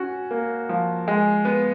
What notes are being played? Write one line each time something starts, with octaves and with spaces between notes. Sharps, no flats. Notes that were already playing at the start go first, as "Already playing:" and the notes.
Already playing: C#4 F#4
A#3
F3
G#3
B3